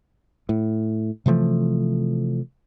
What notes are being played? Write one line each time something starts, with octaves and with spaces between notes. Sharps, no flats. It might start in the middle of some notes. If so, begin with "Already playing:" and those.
A2
C3 E3 F3 A3